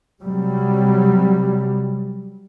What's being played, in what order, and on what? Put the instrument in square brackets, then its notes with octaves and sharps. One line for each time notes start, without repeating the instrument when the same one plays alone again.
[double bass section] C3 F#3 G3